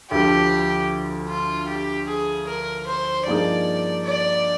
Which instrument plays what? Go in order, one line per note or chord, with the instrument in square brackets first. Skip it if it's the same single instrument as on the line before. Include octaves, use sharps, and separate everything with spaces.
[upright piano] D2 D3 F3 [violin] G4
[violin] F4
G4
G#4
A#4
C5
[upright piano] G2 F3 A#3 D#4 G#4 [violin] D5
[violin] D5